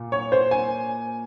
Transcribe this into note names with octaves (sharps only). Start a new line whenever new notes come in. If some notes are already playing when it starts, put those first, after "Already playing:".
Already playing: A#2
C#5
C5
G#5